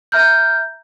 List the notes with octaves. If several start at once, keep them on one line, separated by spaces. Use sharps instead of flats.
E5 A#5 F6 G6